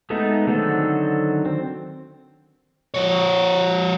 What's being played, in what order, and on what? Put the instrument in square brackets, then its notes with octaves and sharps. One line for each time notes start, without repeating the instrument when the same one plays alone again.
[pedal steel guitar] G#3 A3 B3 D#4
D3 D#3 F#3 C4 A4
C4
[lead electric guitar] F3 C#5